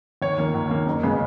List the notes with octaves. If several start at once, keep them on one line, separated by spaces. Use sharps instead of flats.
D#2 C#5
D#3 A#3
D#2
D#3 A#3
F#1
C#3 G#3 B3